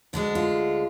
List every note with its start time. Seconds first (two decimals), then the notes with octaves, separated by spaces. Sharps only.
0.13 D2 D3 G#3 D4
0.35 F4